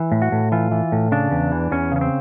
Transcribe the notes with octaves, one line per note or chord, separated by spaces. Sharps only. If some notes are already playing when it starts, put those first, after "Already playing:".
Already playing: E3
A2
F#4
A2
E3 F4
E3
A2
C#3 D4
E2
E3
E2 C#4
C#3 C#4
C4